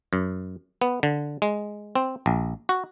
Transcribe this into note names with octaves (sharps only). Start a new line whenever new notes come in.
F#2
B3
D3
G#3
C4
A#1
F#4